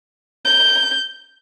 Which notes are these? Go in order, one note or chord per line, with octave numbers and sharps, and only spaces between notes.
G6